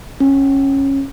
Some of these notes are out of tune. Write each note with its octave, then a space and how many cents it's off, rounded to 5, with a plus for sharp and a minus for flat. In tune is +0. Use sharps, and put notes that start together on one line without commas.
C#4 -15